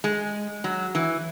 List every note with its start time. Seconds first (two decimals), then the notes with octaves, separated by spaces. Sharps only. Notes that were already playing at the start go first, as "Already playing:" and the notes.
0.04 G#3
0.64 F#3
0.95 E3